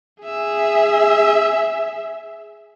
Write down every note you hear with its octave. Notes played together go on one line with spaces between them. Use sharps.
G#4 E5